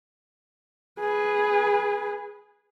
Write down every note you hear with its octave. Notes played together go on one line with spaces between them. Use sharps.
G#4 B4